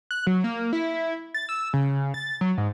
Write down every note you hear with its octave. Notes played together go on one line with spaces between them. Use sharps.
F#6
F#3
A#3
E4
A6
E6
C#3
A6
F#3
G#2